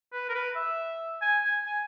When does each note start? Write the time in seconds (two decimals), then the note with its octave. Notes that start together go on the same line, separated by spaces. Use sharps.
0.13 B4
0.29 A#4
0.34 B4
0.56 E5
1.21 G#5
1.44 G#5
1.65 G#5